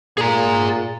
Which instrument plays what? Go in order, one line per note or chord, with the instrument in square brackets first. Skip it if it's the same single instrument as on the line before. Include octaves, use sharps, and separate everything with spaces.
[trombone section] A#2 [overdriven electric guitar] G#4 A#5